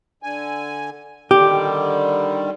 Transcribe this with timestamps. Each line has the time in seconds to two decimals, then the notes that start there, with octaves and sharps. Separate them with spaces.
0.23 D3 G#5
1.31 D3 D#3 G3 G4